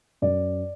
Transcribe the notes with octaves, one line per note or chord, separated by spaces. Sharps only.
F#2 D5